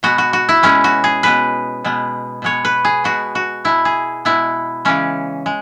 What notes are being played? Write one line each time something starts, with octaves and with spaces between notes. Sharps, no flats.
B2 G#3 B3 F#4
F#4
F#4
E4
B2 G#3 B3 C#4
F#4
G#4
B2 G#3 B3 B4
B2 G#3 B3
B2 G#3 B3 C#5
B4
G#4
B2 G#3 B3 F#4
F#4
B2 G#3 B3 E4
G#4
B2 G#3 B3 E4
C#3 E3 G#3 C#4
G#3